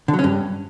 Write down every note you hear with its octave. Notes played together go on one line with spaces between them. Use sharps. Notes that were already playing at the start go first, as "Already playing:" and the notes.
D3
F#3
C#4
G2